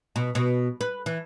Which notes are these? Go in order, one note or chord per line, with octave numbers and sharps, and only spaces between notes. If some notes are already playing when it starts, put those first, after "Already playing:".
B2
B2
B4
E3